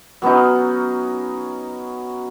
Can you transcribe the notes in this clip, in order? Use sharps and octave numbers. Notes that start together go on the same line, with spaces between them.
F#3 B3 C#4 D#4